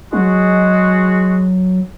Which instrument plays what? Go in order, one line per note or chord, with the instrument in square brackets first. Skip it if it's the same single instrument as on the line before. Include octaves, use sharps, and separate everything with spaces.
[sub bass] F#3 [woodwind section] G#3 F#4